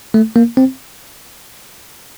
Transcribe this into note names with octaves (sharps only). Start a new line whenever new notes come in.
A3
A#3
C4